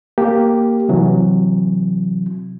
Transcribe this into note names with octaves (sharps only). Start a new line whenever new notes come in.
A#3 G4
C3 E3 F#3